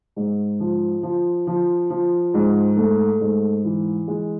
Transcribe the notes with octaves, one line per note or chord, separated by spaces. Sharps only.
G#2
F3
F3
F3
F3
G#2
A3
G#2
E3
G#3